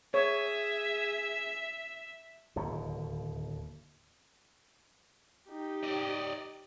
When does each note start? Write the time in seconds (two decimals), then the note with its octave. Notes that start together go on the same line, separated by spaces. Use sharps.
0.14 G#4 C#5 E5
2.56 D1 D#2 B2
5.49 D#4 G4
5.83 D5 D#5